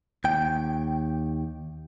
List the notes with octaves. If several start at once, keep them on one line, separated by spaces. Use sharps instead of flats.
D#2 G5